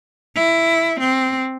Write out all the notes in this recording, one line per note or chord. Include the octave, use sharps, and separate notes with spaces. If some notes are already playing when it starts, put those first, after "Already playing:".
E4
C4